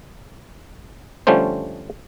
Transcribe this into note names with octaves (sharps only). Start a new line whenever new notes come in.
D3 F3 G3 A3 C#4 C5